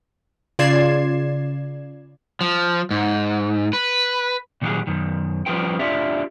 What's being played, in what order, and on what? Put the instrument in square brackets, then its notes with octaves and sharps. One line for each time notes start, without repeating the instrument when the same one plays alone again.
[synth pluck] C#3 F4 D5 G#6 C7 E7
[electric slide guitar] F3
G#2
B4
[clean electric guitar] A#2 D#3 F#3 F4 G4 G#4
F#2 D#3
F3 G3 C#4 F4 B4 G5
D4 F4 G4 D5 E5